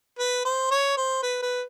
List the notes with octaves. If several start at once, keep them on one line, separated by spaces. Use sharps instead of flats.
B4
C5
C#5
C5
B4
B4